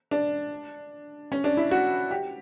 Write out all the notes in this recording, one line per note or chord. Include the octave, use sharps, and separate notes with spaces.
D4
C#4
D4
E4
F#4
G4